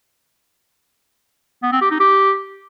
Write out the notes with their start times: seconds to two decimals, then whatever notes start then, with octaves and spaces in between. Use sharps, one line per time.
1.63 B3
1.72 C4
1.82 G4
1.91 D#4
2.00 G4